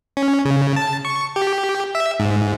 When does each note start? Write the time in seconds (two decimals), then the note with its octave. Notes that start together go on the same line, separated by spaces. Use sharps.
0.17 C#4
0.45 C#3
0.76 A5
1.05 C#6
1.36 G4
1.95 E5
2.20 G#2